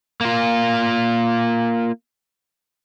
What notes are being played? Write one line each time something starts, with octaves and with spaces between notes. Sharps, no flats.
A#3 F4